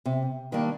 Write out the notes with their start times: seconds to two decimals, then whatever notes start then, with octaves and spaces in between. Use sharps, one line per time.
0.06 C3
0.52 D#3 G3 A#3 D4